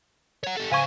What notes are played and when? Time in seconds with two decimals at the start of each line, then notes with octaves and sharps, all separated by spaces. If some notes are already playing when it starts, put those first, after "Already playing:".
0.44 C#5 F#5
0.57 G3 A4
0.72 C#3 C5 F5 G#5 C#6